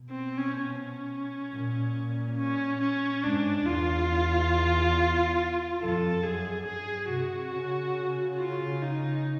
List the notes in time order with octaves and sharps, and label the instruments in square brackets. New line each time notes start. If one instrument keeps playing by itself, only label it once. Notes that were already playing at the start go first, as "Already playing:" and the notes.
Already playing: [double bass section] B2
[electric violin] C4
C#4
C#4
[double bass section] A#2
[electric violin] C#4
C#4
[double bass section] G#2 [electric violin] D4
[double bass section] E2 [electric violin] F4
[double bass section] F2 [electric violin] A4
[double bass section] F#2 [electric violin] G#4
[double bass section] G2 [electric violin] G#4
[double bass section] C3 [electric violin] F#4
[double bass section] C#3
[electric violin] F4
D#4